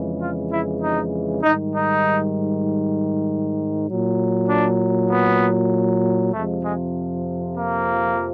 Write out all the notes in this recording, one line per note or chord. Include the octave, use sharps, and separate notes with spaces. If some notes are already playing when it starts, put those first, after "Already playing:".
Already playing: F2 C#3 E3 G#3
F4
E4
D#4
G#2 D#3 G3 D#4
D#4
A#2 F#3
D4
B3
F2 C3 F3 G#3 A3
G#3
A#3